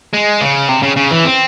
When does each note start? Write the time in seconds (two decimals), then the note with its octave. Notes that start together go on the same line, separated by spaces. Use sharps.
0.14 G#3
0.41 C#3
0.69 C3
0.83 C#3
0.96 C#3
1.11 E3
1.24 C4